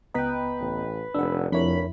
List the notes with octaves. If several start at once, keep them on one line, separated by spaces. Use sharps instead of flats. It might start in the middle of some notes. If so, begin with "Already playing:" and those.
C#2 B3 B4 D#5 G5 A#5
A1
F1 D4 F#5 E6
F1 F2 D4 E4 A#4 C#5 B5